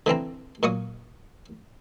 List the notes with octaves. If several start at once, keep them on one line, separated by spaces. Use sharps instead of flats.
D3 E3 C4 A#5
A#2 F#3 C#6 D#6